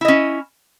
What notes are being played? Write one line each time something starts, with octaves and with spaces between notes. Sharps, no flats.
C#4 E4 D#5